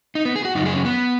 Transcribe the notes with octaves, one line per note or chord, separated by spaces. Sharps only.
D#4
B3
G#4
F#4
F#2 C#3 F#3 D#4
G#4
C#4
B3